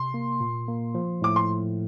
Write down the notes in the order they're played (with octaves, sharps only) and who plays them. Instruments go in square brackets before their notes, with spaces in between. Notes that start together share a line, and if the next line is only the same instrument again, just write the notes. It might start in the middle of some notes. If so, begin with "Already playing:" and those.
Already playing: [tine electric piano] C3 [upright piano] C6
[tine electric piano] A#3
A#2
A#3
F3
[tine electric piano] A2 [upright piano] D6
[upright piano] C6